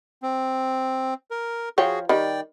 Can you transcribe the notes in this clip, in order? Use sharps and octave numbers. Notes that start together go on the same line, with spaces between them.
C4
A#4
F3 F#4 G#4 C#5 G5
D#3 G3 D5 G5